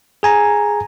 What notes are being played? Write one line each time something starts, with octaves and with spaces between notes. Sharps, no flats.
G#4 G#5 A#5